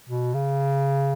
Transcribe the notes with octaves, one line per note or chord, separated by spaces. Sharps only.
B2
C#3